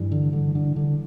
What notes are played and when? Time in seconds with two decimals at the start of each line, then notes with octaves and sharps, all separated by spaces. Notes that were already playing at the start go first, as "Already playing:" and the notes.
Already playing: G2 E3 G3
0.12 D3
0.33 D3
0.55 D3
0.76 D3